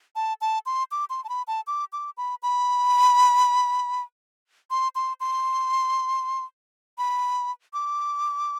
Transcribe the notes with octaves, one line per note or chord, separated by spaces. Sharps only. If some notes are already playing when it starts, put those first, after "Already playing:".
A5
A5
C6
D6
C6
A5
B5
A5
D6
D6
B5
B5
C6
C6
C6
B5
D6